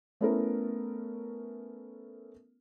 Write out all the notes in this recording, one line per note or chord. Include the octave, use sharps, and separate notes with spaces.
A3 B3 C#4 E4 A4 A#4